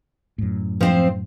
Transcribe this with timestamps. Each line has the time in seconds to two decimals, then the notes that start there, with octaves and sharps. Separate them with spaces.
0.38 F#2 A2
0.81 F3 C4 C5